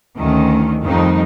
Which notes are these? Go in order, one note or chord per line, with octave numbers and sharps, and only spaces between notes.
D2 D#3 A3 C#4
F2 D#3 F3 G3 D#4